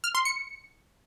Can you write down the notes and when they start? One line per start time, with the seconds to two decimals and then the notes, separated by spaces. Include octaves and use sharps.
0.04 F6
0.15 C6
0.25 C#7